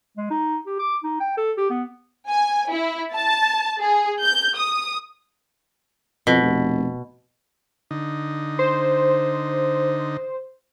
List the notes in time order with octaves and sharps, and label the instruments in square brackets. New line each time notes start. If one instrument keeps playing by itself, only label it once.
[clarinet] G#3
D#4
G4
D6
D#4
G5
A4
G4
B3
[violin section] G#5
E4
A5
G#4
G6
D#6
[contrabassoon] F2 [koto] B2
[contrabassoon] F1
[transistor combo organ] D3 D#4
[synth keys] C5